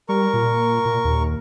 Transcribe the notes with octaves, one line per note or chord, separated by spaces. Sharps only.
G3 A#4 C#6
A#2
A#2
D#2